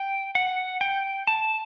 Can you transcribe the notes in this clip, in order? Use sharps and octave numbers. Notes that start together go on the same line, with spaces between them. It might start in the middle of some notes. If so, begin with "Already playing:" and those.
Already playing: G5
F#5
G5
A5